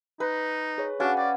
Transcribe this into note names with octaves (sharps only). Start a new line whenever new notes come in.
D#4 B4
G#4 C#5
C#4 D4 F#4 F5 F#5
D5 G5